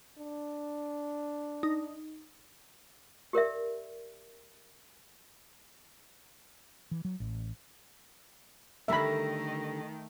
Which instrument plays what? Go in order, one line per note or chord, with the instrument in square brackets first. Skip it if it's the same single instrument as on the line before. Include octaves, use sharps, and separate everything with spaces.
[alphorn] D4
[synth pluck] D#4
[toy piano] G4 A#4 D5 E5
[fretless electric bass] E3
F#3
A1
[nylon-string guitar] D3 G3 A#4 [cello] D#3 [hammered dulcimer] A3 [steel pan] E5 B5